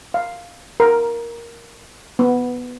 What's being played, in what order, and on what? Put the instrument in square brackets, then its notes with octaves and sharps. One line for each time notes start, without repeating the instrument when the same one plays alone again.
[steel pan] F5
A#4
B3